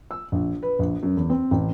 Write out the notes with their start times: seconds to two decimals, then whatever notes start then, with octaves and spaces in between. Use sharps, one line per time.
0.11 E6
0.32 A#1
0.63 B4
0.79 A#1
1.03 F#2
1.17 E2
1.30 C4
1.51 A1